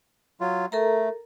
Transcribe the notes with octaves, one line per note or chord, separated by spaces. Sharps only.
F#3 F4
A3 A4 A#4 A#5